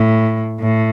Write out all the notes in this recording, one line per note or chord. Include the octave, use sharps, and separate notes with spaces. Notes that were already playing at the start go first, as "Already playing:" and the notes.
Already playing: A2
A2